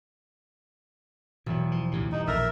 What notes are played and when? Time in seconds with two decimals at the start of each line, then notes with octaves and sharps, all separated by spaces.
1.46 E1 B2 F#3
1.72 F3
1.91 D2 A2 C3
2.12 G2 D#4
2.27 A#1 A4 A#4 E5 A#5 F6